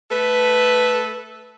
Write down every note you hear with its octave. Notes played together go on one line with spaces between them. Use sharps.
A3 A4 B4